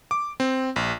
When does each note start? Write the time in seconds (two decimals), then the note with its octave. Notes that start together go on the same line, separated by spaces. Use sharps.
0.11 D6
0.40 C4
0.76 A#1